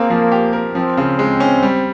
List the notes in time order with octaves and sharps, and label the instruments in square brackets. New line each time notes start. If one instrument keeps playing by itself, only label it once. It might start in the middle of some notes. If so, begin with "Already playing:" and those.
Already playing: [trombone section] A#3 [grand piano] C4 G#4
[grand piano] F3
G4
A#4
[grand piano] F3 [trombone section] C4
[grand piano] C#3
G#3
C#4
G3